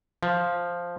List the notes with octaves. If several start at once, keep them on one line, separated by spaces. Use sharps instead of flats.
F3